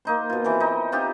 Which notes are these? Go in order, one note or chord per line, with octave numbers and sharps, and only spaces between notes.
A#3 D#4 C5
B2 F4
E3 C4 A#4
D#4
C4 D#4 F4 G4